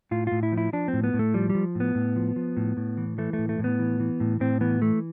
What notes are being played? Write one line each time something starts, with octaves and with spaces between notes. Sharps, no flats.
A2 F4
A2 F4
E4
F3
E4
F3 D4
C4
A2
B3
A2
A3
F3 G3
G3
F3
A2 B3
A2
F3
F3
A2
A2
E3
E3 A3
A2 A3
A3
A2
B3
E3
E3
A2
A2 C4
E3 B3
E3 A3